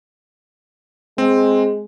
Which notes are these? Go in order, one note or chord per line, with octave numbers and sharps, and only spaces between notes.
G#3 C4